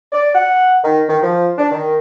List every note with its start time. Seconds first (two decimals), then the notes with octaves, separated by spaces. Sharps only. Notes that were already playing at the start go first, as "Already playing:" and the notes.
0.12 D5
0.35 F#5
0.83 D#3
1.08 D#3
1.22 F3
1.58 D4
1.71 D#3